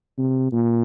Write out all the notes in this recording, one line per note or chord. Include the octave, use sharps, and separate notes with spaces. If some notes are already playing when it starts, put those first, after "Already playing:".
C3
A#2